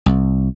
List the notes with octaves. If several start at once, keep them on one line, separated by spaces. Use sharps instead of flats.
C2